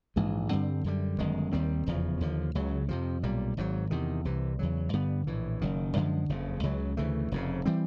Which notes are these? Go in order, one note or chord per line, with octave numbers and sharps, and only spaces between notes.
A#1 G#2 E3 G#3
G2 D3 G3 C4
F#2 D3 G3
G1 F#2 D#3 G#3
D#2 D#3 G3 C4
F1 E2 C#3 F3
D#2 D3 F3
C#2 C#3 F#3
F2 C3 F3
B1 A#2 G3
G#1 G#2 D#3 F#3
E2 C3 D#3
C2 C3 E3
E2 C#3 F#3
G2 D3 G3 B3
A#1 A2 E3
F#1 F#2 D#3
F#2 D3 F3 G#3
F#1 F2 C#3
C#2 C#3 F#3
D2 C#3 E3 A3
F1 F2 C#3
E3 G3 C4